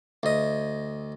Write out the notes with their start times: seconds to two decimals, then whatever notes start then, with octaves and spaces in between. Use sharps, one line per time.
0.23 D2 D#5